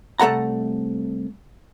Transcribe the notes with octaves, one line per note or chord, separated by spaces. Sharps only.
C2 A3 A4 F#5 A#5